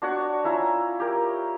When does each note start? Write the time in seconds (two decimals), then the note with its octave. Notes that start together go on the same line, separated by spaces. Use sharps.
0.02 D4 F#4 C#5 F#5
0.44 C#4 E4 F4 A#5
1.00 G4 A#4